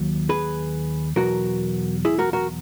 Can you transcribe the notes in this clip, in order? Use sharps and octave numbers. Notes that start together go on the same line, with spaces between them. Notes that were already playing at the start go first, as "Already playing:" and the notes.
Already playing: D#2 F#3
G#4 B4
E2 B2 F#3 F#4 A#4
E4 G#4
F#4 A#4
F#4 A#4